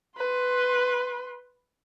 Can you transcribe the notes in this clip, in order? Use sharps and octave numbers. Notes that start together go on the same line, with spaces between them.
B4 C6